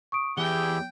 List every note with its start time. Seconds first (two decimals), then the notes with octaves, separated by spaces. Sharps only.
0.12 C#6 D#6 D7
0.37 E2 E4 G4 G#4 G5 G7